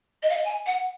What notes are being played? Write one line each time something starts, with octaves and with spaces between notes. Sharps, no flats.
D#5
F5
D#5
G#5
F#5